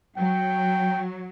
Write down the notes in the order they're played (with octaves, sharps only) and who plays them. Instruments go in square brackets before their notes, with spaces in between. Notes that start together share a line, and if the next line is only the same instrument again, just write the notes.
[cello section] F#3 [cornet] G5